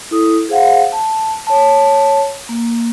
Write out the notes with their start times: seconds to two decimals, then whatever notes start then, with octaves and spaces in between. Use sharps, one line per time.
0.11 E4 A4 D#6
0.49 G#4 C5 F5 F#5
0.92 A5
1.47 C#5 A5
2.49 A#3